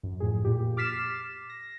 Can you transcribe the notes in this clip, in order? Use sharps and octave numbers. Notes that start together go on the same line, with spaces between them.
F#2
F2 A2 G#4
A#2 G4
D6 F6 A6 B6 C7 E7
A#6